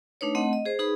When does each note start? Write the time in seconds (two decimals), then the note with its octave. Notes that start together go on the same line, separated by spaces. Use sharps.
0.21 A3 D4 D#4 B4 C#5
0.35 A3 C4 D#5 F#5
0.53 D#5
0.66 G#4 C5
0.79 D#4 G#4 B4 B5